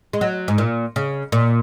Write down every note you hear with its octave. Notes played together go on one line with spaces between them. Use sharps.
G#3
F#3
G#2
A#2
C#3
A#2